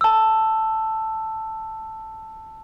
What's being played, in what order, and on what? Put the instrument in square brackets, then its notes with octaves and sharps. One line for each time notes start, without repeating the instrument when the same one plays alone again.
[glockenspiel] A5 E6